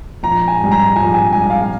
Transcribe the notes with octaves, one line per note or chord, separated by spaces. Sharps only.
A#1 A#5
G#5
G#2 G3
A#5
A#1 G#5
G#5
G#2 G3 G#5
F5
F5